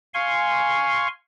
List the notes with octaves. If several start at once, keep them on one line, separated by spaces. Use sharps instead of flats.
F5 G#5 C6 C#6